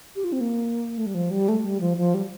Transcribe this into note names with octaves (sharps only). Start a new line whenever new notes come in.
G4
F4
C4
A#3
A3
G3
F3
G3
A3
G3
F3
F3
G3